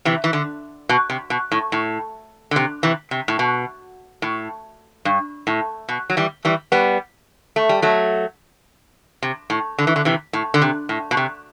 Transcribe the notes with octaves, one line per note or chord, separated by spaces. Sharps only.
C3 E3
E3
D3
B2
C3
B2
A2
A2
D3
C3
C3 E3
C3
A2
B2
A2
G2
A2
B2
F#3
E3 G3
E3 G3
G3 B3
A3
G3
F#3 A3
C3
A2
D3
E3
D3
C3 E3
A2
D3
C3
A2
B2
C3